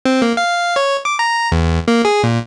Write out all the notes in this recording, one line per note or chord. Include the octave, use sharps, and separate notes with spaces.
C4
A#3
F5
C#5
D6
A#5
E2
A#3
G#4
A#2